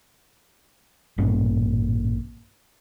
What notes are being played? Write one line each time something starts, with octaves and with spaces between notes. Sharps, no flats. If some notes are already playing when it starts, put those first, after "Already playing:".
A1 G2 A#2 C#4